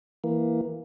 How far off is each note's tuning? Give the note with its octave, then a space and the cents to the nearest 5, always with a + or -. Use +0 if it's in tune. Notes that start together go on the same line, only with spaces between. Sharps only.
E3 +0 A#3 +5